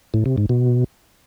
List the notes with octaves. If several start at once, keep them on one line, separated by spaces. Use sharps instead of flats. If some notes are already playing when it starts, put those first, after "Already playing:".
A2
C3
G#2
B2